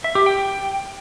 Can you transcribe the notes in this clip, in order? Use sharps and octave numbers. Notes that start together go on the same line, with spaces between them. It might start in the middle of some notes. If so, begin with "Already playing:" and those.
E5
G4
G5